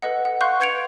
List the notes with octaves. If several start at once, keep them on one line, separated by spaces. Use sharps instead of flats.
A4 B4 D#5 F#5
F#5
F5 F#5 C6 C#6 F#6 G6
B4 G6 G#6 C#7 D7 F7